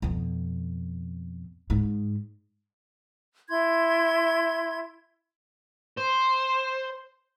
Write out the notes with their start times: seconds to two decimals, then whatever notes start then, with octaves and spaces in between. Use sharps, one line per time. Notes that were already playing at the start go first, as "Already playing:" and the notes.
0.02 F2 B2
1.70 G#2
3.49 E4 C6 G#6
5.97 C5